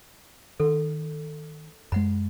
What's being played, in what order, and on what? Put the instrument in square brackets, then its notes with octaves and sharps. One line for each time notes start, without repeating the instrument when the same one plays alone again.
[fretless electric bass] D#3 [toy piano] A4
[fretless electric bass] F#2 G#3 [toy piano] F#5 B5